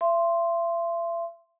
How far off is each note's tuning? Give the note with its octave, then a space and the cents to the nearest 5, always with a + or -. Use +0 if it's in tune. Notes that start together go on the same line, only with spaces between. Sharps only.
E5 +40 C6 +0